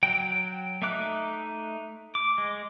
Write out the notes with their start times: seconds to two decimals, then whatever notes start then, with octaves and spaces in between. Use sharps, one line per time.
0.03 F#3 G5
0.82 A3 D#4 E5 D6 F#6
2.15 D6
2.38 G#3